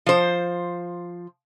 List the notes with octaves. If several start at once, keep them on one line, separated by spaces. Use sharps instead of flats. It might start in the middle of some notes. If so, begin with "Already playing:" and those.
F3 C5